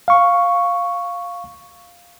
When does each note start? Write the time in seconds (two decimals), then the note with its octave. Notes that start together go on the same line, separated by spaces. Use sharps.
0.08 F5 C#6